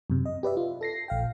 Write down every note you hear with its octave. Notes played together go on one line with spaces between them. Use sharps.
F#2 C3
D#5
G4 B4 D5 E5
F4
A4 A#6 C7
A#1 F5 G5